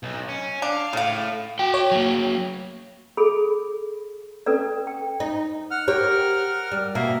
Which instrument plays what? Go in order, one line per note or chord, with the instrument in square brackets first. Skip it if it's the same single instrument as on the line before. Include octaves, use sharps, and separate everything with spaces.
[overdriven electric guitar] B1
C#4
[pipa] D4 [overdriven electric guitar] F5
[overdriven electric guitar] A2 [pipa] C#3 F5
[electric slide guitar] F#4 G5
[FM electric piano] C#5
[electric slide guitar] F#3 A#3
[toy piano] G#4 A4 B5
C#4 A4 B4 D5
G5
[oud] D#4
[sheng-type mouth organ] F#5 F6
[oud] G4 C#5 [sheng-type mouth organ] A#4 F#5 F6
[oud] G3
[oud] B2 A#3 [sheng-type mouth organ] E5 F5